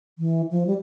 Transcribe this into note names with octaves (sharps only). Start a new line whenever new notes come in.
E3
F3
G3